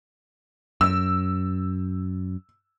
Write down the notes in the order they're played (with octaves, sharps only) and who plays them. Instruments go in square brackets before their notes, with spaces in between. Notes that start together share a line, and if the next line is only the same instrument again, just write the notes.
[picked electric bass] F#2 [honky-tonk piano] E6